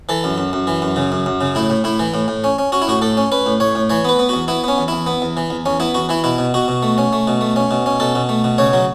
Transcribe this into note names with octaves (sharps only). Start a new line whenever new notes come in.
E3 A4
F#2
F#2
F#2
E3
F#2
C#3
F#2
F#2
C#3
A2 E4
A2
A2 E4
E3
A2
A2
C#4
C#4
C#4 F#4
E4
A2 F#4
A2 A4
C#4
C#4 B4
A2
A2 C#5
A2
E3 C#5
B3 B4
B3
E2 F#4
B3 E4
B3 C#4
E2
E2 E4
B3
E2
E3
E2
E2 C#4
B3 E4
E2 F#4
E3 E4
B2 E4
B2
B2 F#4
B2
A3
C#4
A3
B2
A3
C#4
B2
C#4
B2 A4
B2
A3
B2
C#3 C#5
F#3